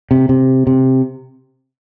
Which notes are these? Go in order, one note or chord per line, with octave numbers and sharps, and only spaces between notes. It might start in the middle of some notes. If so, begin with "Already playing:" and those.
C3
C3
C3